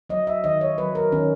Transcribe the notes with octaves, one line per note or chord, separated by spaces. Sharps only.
F#3 D#5
E5
D#3 D#5
C#5
F#3 B4
A#4
D#3 C#4